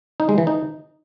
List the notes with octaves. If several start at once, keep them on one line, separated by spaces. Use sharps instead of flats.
D#4
G#3
E3
D#4